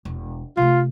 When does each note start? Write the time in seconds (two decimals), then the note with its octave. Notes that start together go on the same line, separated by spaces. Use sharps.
0.05 E1
0.57 C3 A3 F4